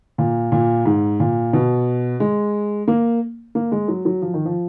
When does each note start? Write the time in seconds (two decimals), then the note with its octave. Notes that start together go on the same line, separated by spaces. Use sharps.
0.18 A#2
0.52 A#2
0.86 G#2
1.20 A#2
1.53 B2
2.20 G#3
2.88 A#3
3.55 A#3
3.72 G#3
3.88 F#3
4.05 F#3
4.22 F3
4.34 D#3
4.45 F3